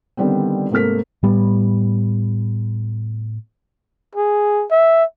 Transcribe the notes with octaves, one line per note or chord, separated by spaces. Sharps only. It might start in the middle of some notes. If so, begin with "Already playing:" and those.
D3 D#3 G3 B3 C4
G#2 C3 A3 A#3 F6 B6
A2 G3 B3
G#4
E5